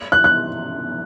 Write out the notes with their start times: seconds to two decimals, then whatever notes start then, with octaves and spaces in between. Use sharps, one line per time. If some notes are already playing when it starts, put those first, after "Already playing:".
0.12 F#6
0.24 F#6